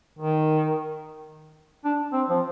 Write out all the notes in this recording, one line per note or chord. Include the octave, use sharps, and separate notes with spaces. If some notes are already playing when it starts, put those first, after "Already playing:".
D#3
D4
C4
F3